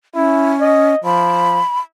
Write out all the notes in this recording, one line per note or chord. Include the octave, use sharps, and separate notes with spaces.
C#4 E4
D#5
F3 B5